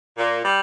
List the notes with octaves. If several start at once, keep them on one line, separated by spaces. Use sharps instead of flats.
A#2
G3